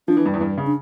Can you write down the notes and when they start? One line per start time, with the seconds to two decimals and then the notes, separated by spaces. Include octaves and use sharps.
0.08 F3 D4
0.17 E3
0.25 G2
0.34 E2
0.41 G2
0.58 C#3
0.66 D4